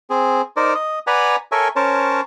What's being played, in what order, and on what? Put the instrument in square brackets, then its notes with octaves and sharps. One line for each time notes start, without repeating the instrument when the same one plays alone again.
[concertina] C4 G#4
D#4 A#4 C5 D5
D#5
B4 D5 F#5 G#5 A#5 B5
A4 A#4 C#5 E5 G#5
C#4 A#4 C5 C#5 A5